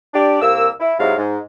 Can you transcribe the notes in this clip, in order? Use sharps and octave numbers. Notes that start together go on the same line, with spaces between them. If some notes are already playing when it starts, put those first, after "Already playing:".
D4 G4 D5
C2 A#3 E6
E4
G#2 C3 F#3 G#3 E4 F5
G#2